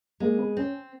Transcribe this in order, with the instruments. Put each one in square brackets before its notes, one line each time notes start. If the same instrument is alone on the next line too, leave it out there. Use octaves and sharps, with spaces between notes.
[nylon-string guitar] G#3 [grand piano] A#3
[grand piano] B3
[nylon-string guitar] C4 [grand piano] C#4